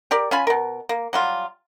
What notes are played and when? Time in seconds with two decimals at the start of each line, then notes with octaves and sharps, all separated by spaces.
0.11 G4 A#4 D5
0.31 C#4 F4 G#5 B5
0.47 B2 A#4
0.89 A#3
1.13 F#3 G3 F4